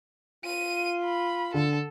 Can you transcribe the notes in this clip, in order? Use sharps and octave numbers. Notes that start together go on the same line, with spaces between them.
F4 D#7
B5
D3 A4